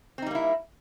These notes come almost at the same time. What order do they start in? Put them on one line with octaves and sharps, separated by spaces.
C4 D#4 G3 A#3 E4